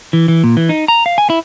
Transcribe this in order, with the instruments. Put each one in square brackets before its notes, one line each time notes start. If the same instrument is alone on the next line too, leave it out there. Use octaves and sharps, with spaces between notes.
[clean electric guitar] E3
E3
A#2
E3
D#4
A#5
F5
G#5
E4